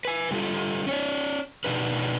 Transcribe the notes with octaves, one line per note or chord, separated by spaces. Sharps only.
B4 G#5
D3 G3 F4 A4
C#4 C#5 D5
B2 D#3 D4 D#4 B4